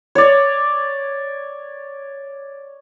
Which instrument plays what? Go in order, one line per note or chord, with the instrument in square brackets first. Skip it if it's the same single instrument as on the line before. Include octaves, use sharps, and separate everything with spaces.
[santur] C#5 D5